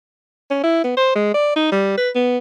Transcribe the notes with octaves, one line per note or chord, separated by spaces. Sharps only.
C#4
E4
B3
C5
G#3
D5
D#4
G3
B4
B3